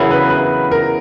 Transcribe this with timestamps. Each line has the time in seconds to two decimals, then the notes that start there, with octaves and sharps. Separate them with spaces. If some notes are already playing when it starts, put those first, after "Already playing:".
Already playing: E2 C#3 F#3 B3 E4 A#4
0.11 B4
0.30 B4
0.71 A#4